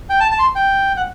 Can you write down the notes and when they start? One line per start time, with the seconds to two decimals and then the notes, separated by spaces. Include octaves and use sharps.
0.10 G5
0.20 A5
0.31 A5
0.39 C6
0.55 G5
0.97 F#5